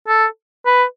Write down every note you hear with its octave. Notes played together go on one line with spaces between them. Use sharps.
A4
B4